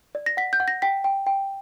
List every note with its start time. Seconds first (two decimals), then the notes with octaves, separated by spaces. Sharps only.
0.15 D5
0.26 A#6
0.37 F#5 B6
0.53 G6
0.60 F#5
0.68 A#6
0.82 G5 B6
1.04 G5
1.27 G5